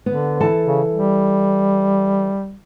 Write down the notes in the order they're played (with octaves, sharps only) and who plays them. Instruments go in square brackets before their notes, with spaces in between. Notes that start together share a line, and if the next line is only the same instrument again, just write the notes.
[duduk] D3 [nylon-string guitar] B3
[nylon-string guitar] E3 A4 A5
[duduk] C#3
G3